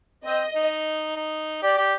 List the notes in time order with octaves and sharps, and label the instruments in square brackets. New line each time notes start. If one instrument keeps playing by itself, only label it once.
[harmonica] C4 [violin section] D#5
[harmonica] D#4
D#4
[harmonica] G4 [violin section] D5
[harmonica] G4